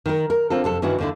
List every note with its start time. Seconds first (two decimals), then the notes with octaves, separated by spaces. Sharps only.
0.06 D#3 A#4
0.30 A#4
0.50 D3 C4 F4 A4
0.64 F2 C3 A4
0.82 G2 D#3 E3 C#4 E4 F#4
0.99 D#2 D3 E4